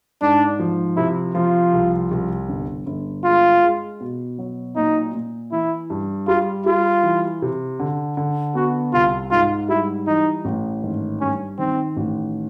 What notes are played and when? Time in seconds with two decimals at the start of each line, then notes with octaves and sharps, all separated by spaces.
0.21 G#2 D4
0.59 F3
0.97 C3 E4
1.35 F3 F4
1.73 C2
2.11 C2
2.49 G1
2.86 G1
3.24 G#3 F4
3.63 G#3
4.00 B2
4.39 F#3
4.76 A#2 D#4
5.14 A#2
5.52 E3 E4
5.90 G2
6.28 G3 F4
6.66 G3 F4
7.03 E3
7.42 C3
7.79 D3
8.17 D3
8.55 B3 F#4
8.93 C2 F4
9.31 G#2 F4
9.69 G3 E4
10.07 E3 D#4
10.45 A1
10.83 G#1
11.20 G2 C#4
11.58 D#3 C4
11.97 A1